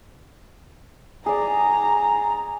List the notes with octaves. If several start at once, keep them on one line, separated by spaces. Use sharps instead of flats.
G#4 D5 A#5